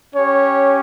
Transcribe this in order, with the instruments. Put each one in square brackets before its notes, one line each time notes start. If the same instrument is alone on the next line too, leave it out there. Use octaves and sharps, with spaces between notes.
[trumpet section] C#4 G4 C#5